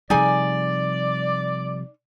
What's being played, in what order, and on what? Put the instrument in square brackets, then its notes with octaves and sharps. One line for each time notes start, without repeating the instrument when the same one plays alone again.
[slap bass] C3 F3 G3 [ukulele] D#4 G#4 G#5 [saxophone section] D5